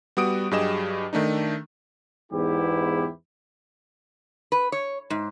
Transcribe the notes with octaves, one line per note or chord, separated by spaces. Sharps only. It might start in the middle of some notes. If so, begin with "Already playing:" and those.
G3 B3 F#4 D#6 D7
G2 F#3 G4 G#4 D#5 E7
D#3 A3 D4 D#4
E2 G#2 B3 E4 G4
B4
C#5
G#2